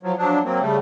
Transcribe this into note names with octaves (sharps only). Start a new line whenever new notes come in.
F3 F#3
F3 F#3 D4
F#3 A#3 C4
C#3 G3 A3